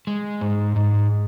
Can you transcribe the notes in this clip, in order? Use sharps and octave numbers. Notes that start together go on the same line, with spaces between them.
G#3
G#2
G#2